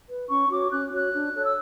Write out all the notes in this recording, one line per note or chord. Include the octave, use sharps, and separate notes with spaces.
B4
C#4 C#6
F#4 C#5 D6
C#4 F#6
F#4 C#5 F#6
D4
A4 C#5
E6